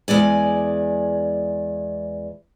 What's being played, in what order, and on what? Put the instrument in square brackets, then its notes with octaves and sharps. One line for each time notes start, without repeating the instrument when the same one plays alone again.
[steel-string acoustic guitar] E2 G#3 D5 G#5